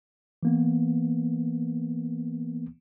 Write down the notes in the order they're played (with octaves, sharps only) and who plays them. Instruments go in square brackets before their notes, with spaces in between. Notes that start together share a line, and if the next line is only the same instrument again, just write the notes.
[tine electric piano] E3 A#3 B3